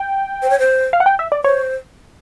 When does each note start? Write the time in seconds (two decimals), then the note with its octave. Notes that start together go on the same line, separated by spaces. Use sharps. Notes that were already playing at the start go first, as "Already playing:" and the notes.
Already playing: G5
0.42 C5
0.50 C#5
0.59 C5
0.93 F5
1.00 F#5
1.06 G5
1.19 E5
1.32 D5
1.44 C5 C#5